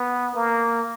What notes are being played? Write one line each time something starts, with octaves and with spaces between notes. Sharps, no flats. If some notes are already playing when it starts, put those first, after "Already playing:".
Already playing: B3
A#3